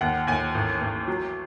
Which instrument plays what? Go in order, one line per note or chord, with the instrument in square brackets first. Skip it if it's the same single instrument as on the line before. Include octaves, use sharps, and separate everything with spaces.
[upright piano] D#2 F#5
D#2 G#5
A1
A1
F#3